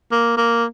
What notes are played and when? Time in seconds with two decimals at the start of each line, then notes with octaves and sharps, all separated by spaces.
0.12 A#3
0.37 A#3